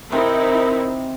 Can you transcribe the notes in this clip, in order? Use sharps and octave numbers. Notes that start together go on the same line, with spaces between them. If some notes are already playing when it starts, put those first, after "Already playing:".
C3 C4 D#4 E4 A#4